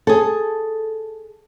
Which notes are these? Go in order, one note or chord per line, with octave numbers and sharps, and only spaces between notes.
G#4 A4